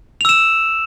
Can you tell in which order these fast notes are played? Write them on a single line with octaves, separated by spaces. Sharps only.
F7 E6 E7